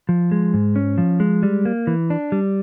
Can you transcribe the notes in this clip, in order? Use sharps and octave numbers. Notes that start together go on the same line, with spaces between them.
F3
G#3
G#2
C#4
F3
G#3
G3
A#3
E3
D4
G3